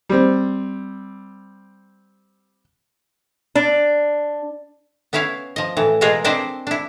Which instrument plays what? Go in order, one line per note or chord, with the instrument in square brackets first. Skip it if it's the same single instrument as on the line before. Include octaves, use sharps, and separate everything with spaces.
[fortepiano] G3 C4
[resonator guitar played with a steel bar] D4
[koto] B3 C#4 E4 C#5 F5
F3 D#5
A2 E3
B2 E3 G#3 F4 G#4 A#4
C4 D4 E4 C5 D5 D#5
D4 E4